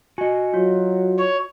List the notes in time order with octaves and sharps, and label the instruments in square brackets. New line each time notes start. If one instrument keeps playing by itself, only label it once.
[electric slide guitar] F#4 D#5 [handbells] G#5
[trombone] F#3 [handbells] F4
[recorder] C#5